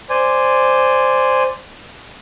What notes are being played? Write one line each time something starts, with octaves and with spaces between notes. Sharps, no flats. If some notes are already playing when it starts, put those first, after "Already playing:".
C5 D5 G#5